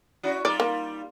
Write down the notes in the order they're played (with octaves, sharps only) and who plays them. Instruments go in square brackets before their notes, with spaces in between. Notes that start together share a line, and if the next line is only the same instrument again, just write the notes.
[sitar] C#4 E4 F#4
[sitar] G3 D#4 F4 [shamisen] D5
[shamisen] A#3